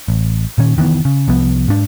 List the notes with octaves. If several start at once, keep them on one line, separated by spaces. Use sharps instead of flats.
A1
A#2 D#3 C#4
F1 D#3 E3 B3
C#3
C2 F3 B3
G#2 D4